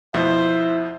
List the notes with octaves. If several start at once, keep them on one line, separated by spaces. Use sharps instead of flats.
F2 B2 E4 C5 E5